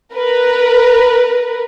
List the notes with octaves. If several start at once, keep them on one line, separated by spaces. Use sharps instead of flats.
A#4 B4